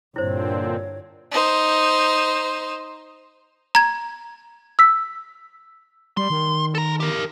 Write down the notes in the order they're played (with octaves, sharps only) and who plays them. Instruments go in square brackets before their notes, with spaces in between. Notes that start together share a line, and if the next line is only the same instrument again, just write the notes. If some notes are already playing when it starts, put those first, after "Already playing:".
[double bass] G2 [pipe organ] A#2 D3 C4 [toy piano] E4 C5 [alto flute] C#5
[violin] D#4 C5
[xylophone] A#5 G#6
E6 B6
[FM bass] G3 [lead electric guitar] C6
[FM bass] D#3
[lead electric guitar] A4 A#5
G4 A#4